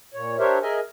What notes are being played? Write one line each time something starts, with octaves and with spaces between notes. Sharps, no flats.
A#2 C#5
D4 G4 A#4 C5 C#5 E5
G#4 A#4 D#5 E5 G#5